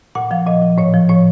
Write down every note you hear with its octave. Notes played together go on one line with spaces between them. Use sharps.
A#2 F#5
F3 F5
A#2 D#5
F3
A2 C#5
F3
A2 C#5